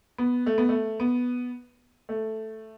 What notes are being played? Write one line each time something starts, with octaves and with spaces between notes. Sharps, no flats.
B3
A3
B3
A3
B3
A3